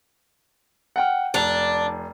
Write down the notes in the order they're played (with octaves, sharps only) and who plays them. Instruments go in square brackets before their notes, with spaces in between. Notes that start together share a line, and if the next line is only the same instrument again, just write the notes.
[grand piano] F#5 G5 F6
[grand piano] F1 F7 [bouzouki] D4